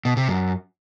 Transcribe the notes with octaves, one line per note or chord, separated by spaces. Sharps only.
B2
C3
F#2